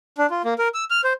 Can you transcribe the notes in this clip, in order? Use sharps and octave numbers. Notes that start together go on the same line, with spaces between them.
D4
F4
A#3
A#4
E6
F6
C5